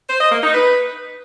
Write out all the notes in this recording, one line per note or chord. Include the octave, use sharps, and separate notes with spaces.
C5
D#5
A#3
D#4
B4